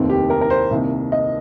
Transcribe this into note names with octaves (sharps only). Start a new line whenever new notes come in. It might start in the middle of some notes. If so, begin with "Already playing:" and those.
Already playing: F1 D#2 D#3 C4
G4
A#4
A#4
C5
C2 C3 D#3 A#3
D#5